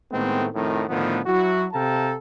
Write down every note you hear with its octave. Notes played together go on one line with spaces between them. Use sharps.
A2 D#3 G#3 A3 B3 C4
F2 A2 D#3
A2 D3 D#3 F3 B3
F#3 E4 F#4
C3 A4 F5 G5 A5 A#5